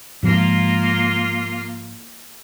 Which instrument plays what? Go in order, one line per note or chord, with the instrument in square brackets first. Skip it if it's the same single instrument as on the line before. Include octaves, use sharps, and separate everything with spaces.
[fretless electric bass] G#2 F3 G#3 [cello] A#3 F4